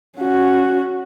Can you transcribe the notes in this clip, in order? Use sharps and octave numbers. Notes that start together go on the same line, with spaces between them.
C#4 F#4